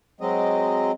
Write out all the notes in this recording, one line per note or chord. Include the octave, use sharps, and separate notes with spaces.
F#3 G#3 C4 D#5